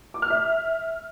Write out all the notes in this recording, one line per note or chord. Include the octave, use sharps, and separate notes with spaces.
D6
F6
E5